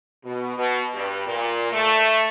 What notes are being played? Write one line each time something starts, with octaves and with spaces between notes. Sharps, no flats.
B2
B2
G2
A#2
A3